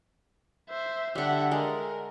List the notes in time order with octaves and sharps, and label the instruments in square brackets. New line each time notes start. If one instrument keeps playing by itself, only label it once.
[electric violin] C5 E5
[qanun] D3 G3 [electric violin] E5 F#5
[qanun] G#3 [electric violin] A#4